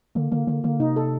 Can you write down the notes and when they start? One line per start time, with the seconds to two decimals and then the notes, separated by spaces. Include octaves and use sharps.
0.15 D3 A#3
0.32 D3 A#3
0.47 D3 A#3
0.64 D3 A#3
0.80 C3 D#4
0.96 A4